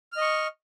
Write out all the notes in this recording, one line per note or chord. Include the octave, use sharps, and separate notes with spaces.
D#5 C#6 F6